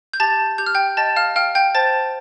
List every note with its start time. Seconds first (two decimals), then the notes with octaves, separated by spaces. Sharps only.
0.13 G6
0.20 G4 A5 A6
0.58 G4 G6
0.66 F6
0.75 G5 G6
0.97 D#5 A5 A6
1.16 F5 F6
1.36 F5 G5 F6
1.55 G5 G6
1.75 C5 A5 A6